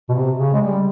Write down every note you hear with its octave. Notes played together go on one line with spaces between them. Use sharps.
B2
C3
C#3
G#3
G3